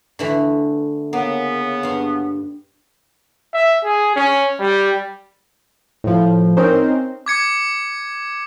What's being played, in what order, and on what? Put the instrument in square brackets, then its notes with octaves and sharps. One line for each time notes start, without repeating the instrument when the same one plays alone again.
[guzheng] D3 E3 A3
[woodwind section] C#3 B3 [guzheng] A#3
[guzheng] G2 F5
[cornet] E5
G#4
C#4
G3
[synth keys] A2 F3
C4 C#4 D#4 A#4 C5
[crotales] D6 G#6 C#7